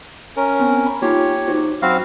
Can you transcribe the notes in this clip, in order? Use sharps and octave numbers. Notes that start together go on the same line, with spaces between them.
C#4 A#4
B3 C4
B5
A#3 D#4 F4 G4 C#5
D#4 F#4 C5
F#2 C4 F#4 F5 B5